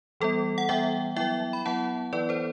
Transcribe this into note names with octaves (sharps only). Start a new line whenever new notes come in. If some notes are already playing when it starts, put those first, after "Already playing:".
E3 G3 B3 A4
F#5
E3 G3 B3 E5 G5
F#3 B3 E4 E5 G5
B5
F#3 B3 E4 F#5 A5
E3 B3 E4 B4 D5
A4 C5